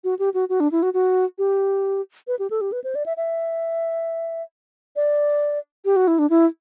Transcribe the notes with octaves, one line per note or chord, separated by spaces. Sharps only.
F#4
G4
F#4
F#4
D4
E4
F#4
F#4
G4
B4
G4
A4
G4
B4
C5
D5
E5
E5
D5
G4
F#4
E4
D4
E4